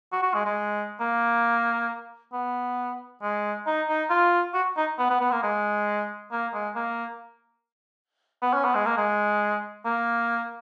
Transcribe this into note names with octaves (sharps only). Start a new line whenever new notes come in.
F#4
F#4
G#3
G#3
A#3
B3
G#3
D#4
D#4
F4
F#4
D#4
B3
B3
B3
A#3
G#3
A#3
G#3
A#3
B3
C#4
B3
G#3
A#3
G#3
A#3